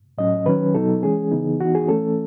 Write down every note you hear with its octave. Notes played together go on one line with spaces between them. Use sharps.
A2 F#3 C#4 D#5
D#3 F#3 C#4 B4
B2 F#3 B3 D#4 A4
E3 G#3 C#4 G#4
C#3 E3 B3 D#4
E3 B3 D#4 F#4
G#4
E3 A3 C#4 A4